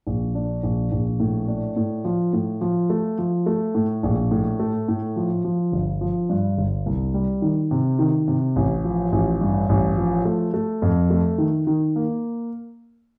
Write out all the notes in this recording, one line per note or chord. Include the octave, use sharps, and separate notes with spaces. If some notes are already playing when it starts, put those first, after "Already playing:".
A#1
D4
A#1
A#1
A2
D4
A2
F3
A2
F3
A3
F3
A3
A2
A#1
A2
A3
A2
F3
F3
G1
F3
G2
G1
C2
G3
D#3
C3
D#3
C3
A1
F3
A1
G2
A1
F3
A3
A3
F2
A3
D#3
D#3
A#3